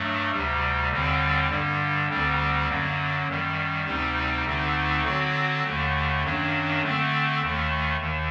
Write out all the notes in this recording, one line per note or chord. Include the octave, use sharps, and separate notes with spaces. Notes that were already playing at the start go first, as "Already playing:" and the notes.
Already playing: G2 F#3 A3
D2 C3 G3
D#2 D3 G3 C4
G2 D3 G3
D2 D3 G3 C4
F#2 D3 F#3 A#3
F#2 D#3 G3
D2 C3 G3 C4 D#4
D2 D3 A3 C4 D#4
D3 F#3 C4 F#4
D#2 D3 A3
F#2 D#3 F#3 A#3 D4
D3 A3 C4
D#2 D#3 A3
D#2 D#3